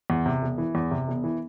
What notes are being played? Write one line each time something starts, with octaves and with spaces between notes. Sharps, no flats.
E2
C3
E1
E3
E2
C3
E1
E3